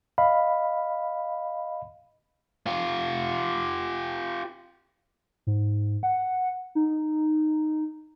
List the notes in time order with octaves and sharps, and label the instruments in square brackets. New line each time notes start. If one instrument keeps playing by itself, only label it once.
[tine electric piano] D#5 F5 B5
[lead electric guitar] F4 G4
[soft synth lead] G#2
F#5
D#4